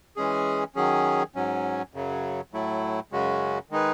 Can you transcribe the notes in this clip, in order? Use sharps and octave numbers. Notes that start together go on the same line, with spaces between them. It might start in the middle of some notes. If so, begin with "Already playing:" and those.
E3 G#3 C#4 G#4
D#3 F#3 C#4 G#4
G#2 F#3 C#4
F#2 C#3 F#3
A2 F#3 A3 E4
F#2 C#3 G#3 C#4 F#4
D#3 G#3 D#4 G#4 B4